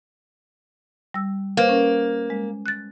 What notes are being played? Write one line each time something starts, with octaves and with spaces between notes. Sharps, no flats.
G3 E6
A#3 B4 C5
C#4 A#4
G#3
F#6 A6